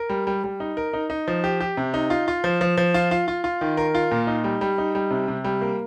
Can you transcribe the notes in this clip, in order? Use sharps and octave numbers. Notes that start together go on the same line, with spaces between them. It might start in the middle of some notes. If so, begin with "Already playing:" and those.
Already playing: A#4
G3
G3
G3
D#4
A#4
D#4
D#4
F3
G4
G4
C3
D#4
F4
F4
F3
F3
F3
F4
F4
F4
F4
D#3
A#4
F4
A#2
D#4
G3
G3
D#4
G3
C3
C3
G3
A#3